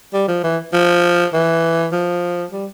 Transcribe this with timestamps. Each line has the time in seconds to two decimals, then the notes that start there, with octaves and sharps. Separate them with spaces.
0.13 G3
0.28 F3
0.44 E3
0.73 F3
1.33 E3
1.92 F3
2.52 G3